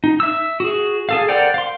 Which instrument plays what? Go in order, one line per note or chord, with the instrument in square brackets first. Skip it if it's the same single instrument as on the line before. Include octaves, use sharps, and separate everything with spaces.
[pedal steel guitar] D#4
E5 E6
F#4 G#4
G#4 A4 F5
A#4 C5 D5 F#5 G5
F5 C6